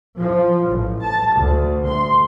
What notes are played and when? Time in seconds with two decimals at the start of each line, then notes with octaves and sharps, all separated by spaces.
0.18 F3
0.69 A1
1.02 A5
1.35 D2
1.86 C6